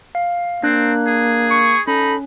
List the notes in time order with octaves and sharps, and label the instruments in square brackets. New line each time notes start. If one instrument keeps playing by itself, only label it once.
[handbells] F5
[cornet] A#3 [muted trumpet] C4 [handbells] D4 F#6
[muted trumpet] G#4
[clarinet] C#6
[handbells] C#4 [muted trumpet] D#4 [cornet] A4 [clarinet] B5